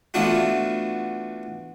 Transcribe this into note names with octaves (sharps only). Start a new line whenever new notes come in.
E3 A3 B3 D4 F4 F#4